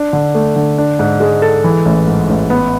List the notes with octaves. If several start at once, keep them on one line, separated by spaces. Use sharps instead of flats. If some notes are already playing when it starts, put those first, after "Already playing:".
Already playing: D4
D3
A3
D3
D4
G#2
G#3
A4
E3
A1
G#2
A1
B3